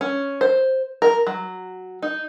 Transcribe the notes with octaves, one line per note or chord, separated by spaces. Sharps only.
C#4
C5
A#4
F#3
D#4